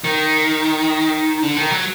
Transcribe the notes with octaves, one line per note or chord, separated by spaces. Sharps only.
D#3
D3
D#3
F#3